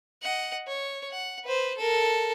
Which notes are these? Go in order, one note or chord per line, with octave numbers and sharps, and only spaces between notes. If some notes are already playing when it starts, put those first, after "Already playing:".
D#5 F#5
C#5
F#5
B4 C5
A4 A#4